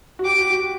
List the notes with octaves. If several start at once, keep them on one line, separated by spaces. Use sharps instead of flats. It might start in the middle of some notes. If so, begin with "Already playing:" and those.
F#4
G4 D6
F#4
F#4